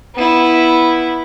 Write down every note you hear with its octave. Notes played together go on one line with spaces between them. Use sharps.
B3 E4